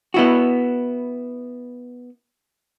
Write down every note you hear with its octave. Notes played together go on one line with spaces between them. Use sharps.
B3 E4 F#4